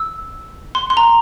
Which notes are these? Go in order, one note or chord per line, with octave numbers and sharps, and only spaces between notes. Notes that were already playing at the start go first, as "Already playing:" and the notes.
Already playing: E6
C6
C6
A#5